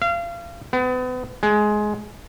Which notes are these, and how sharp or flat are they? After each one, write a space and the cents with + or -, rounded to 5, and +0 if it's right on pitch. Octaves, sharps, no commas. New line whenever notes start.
F5 -30
B3 +35
G#3 +15